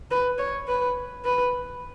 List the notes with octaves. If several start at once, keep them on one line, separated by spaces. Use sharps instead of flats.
B4
C#5
B4
B4